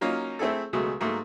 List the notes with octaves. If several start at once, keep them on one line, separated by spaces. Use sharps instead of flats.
F#3 A#3 C#4 D#4 F4
A3 C4 E4 G#4 A4
C#2 B2 F#3 G#3 A3
G#2 F#3 A3 A#3